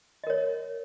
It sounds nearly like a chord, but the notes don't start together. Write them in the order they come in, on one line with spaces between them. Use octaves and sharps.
D#5 A#4 C#5